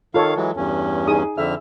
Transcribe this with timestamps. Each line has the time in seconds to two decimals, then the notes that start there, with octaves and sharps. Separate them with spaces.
0.14 D#3 F4 A4 C#5 F5
0.36 E3 F#3 G#3
0.56 E2 G2 C#4
1.07 D#4 G#4 D#6
1.38 F2 D3 E5 F6